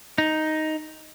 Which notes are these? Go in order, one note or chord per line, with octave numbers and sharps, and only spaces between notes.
D#4